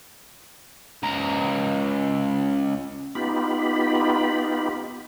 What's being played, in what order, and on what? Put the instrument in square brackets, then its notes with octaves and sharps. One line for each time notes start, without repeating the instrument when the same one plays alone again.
[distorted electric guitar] C#2 A#5
[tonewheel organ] B3 D#4 F4 G4 B5